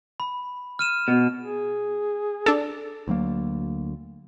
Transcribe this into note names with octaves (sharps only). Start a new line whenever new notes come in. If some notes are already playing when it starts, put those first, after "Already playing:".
B5
F6 D#7 E7
B2
G#4
D4 A4
D2 F#3 A#3